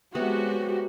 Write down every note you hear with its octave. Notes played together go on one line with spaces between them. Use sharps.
C3 F#3 G#3 B3 F#4 G4